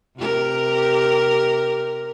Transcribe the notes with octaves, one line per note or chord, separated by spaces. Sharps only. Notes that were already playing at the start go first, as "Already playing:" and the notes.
C3 G4 A#4